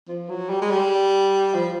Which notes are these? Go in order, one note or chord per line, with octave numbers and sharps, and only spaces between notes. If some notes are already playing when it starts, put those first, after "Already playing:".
F3
F#3
G3
G#3
G3
F3